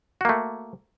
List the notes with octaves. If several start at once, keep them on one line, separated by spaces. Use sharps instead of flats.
A3 A#3 F#4